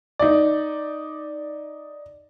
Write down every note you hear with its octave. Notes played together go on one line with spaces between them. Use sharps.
D#4 D5